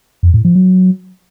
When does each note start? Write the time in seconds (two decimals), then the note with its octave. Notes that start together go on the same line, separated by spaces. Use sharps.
0.23 F2
0.34 A2
0.45 F3
0.55 F#3